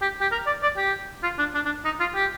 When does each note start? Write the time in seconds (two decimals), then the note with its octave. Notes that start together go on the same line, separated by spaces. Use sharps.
0.02 G4
0.21 G4
0.32 A#4
0.46 D5
0.63 D5
0.77 G4
1.23 F4
1.38 D4
1.55 D4
1.65 D4
1.85 D#4
2.00 F4
2.15 G4